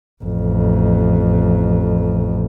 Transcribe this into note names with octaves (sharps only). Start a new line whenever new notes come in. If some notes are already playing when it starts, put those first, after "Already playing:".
A1 F2